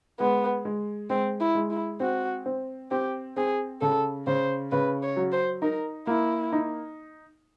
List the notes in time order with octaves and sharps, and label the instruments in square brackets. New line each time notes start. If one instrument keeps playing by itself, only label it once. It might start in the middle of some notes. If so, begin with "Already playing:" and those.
[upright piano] G#3 [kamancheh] B3
[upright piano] G#3
[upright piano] G#3 [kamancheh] C4
[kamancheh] E4
[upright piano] G#3
[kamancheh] E4
[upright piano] C4 [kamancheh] F#4
[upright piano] C4
[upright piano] C4 [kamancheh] G4
[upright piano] C4 [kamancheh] G#4
[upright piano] C#3 [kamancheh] A4
[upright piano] C#3 [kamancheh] C5
[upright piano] C#3 [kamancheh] B4
[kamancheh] C#5
[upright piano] F#3
[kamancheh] C5
[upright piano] D#4 [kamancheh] A#4
[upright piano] A#3 [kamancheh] E4
[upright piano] D#4